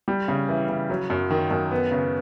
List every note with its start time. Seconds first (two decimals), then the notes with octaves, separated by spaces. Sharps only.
0.08 G3
0.28 C#3
0.49 E3
0.69 C#3
0.90 F#3
1.10 F#2
1.30 D#3
1.51 F#2
1.71 B3
1.91 C#3